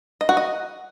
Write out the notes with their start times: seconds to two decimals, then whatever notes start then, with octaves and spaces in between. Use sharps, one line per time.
0.21 D#5
0.29 F#4
0.37 D#5